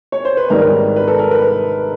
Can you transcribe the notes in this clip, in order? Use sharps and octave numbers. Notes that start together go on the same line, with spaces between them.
C#5
C5
B4
G#1 G#2 D#3 G3 A#4
B4
A4
A#4
B4